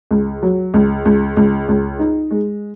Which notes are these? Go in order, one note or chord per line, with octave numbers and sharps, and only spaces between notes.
C#2
F#3
C#2
C#2
C#2
C#2
D#4
G#3